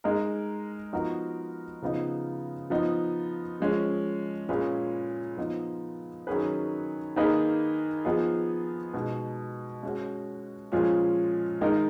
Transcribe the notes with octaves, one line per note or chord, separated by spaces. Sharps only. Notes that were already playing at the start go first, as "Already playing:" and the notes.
G#3 D#4 A#4
F3 B3 D#4 F#4 A#4
C#3 F3 B3 D#4
F3 B3 D#4
F3 G#3 C#4
A#2 G#3 C#4 G#4 B4
F3 B3 D#4
D#3 F#3 C#4 G#4 B4
D#3 A#3 D#4 G#4 B4
F3 B3 D#4 G#4
B2 G#3 D#4
G#3 C#4 F#4
A#2 F3 G#3 C#4 G#4
D#3 G#3 D#4 A#4